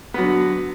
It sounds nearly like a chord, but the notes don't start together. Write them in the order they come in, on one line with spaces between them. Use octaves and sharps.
B3 F#3 D3